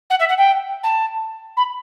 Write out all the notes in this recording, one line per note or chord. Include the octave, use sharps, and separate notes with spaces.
F#5
E5
F#5
G5
A5
B5